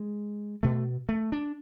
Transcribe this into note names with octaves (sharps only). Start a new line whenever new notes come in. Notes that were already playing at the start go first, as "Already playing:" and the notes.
Already playing: G#3
B2 A3
A3
D4